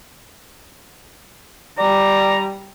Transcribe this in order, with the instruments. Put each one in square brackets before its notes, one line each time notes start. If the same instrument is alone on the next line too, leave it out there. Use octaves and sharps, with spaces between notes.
[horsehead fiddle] G3 [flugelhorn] D5 [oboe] A#5